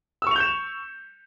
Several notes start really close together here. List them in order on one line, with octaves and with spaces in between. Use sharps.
E6 C#6 F7 G6 E7